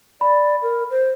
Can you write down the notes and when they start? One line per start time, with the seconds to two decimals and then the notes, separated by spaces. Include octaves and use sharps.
0.21 D5 B5
0.62 A#4
0.90 C5